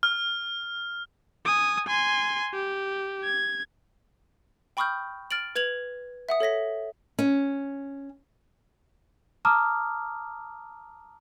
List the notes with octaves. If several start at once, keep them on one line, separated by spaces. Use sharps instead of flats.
F6
G#5 D#6
G#5 C6
G4
G#6
G5 B5 C#6 D#6 F6 G6
F6 A6 D7 F#7
B4 G#6 F7 F#7
E5 F#5 D#6
A4 C#5 A#6 B6
C#4
A5 A#5 D6 D#6 F6